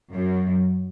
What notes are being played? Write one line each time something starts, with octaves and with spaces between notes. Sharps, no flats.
F#2